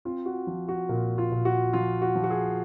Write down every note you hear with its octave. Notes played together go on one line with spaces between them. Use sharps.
C4 F4
F#4
F3
F#4
A#2 A#4
F4
A#2
F#4
F3 F4
F#4
F3
F#4
G#4